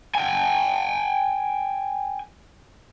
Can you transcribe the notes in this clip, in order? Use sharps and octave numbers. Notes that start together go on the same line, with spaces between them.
G5 G#5